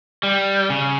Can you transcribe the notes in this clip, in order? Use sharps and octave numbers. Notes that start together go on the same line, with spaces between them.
G3
C#3